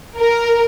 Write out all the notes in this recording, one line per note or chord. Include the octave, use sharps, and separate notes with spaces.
A#4